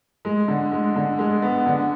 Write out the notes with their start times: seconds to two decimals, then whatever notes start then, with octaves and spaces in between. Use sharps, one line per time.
0.25 G#3
0.48 D3
0.72 G#3
0.96 D3
1.19 G#3
1.42 B3
1.66 D3